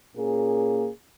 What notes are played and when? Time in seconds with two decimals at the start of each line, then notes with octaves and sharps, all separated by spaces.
0.16 A#2 A#3 C#4 G#4